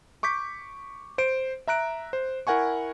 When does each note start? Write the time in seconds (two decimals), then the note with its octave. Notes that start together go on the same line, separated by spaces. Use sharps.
0.23 C#6 D6 G6 B6
1.18 C5 D7
1.67 E5 A#5 F#6 D7
2.13 C5
2.47 E4 A#4 F#5 G#5 C#6